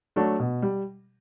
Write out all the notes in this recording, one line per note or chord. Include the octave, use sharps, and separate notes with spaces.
F#3 A3 D4 F#4
B2
G3